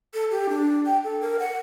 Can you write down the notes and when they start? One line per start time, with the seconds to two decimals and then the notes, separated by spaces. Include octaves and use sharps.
0.14 A4
0.31 G4
0.49 D4
0.86 G5
1.04 A4
1.21 A#4
1.39 F#5